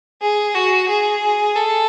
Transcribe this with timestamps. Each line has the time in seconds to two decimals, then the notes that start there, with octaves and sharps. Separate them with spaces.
0.21 G#4
0.55 F#4
0.89 G#4
1.56 A4